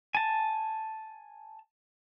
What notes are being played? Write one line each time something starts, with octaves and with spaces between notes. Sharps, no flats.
G#5 A5